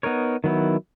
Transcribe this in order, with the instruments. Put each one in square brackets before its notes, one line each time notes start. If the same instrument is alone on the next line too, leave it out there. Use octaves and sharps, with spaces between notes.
[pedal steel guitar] B3 D#4 A#4 C#5
D#3 F#3 B3 E4